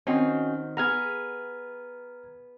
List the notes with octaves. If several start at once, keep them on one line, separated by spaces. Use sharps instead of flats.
D#3 C4 C#4 F#4 D#5
B3 G#4 A#5 F6 G#6